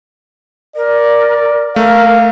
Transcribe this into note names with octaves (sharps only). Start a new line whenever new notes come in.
A#4 D5
A3 A#4 F5